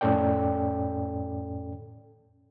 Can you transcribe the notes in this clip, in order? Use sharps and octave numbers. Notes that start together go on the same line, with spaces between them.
F2 A2 C#4 A4 D5 G5